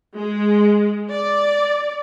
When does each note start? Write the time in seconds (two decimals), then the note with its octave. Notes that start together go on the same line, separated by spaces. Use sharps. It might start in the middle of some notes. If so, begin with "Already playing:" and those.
0.14 G#3
1.10 D5